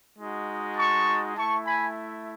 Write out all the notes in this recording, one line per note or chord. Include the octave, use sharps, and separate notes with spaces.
G#3 D#4 F#4
A5 C#6
A3 E4 A5 C#6
G#5 B5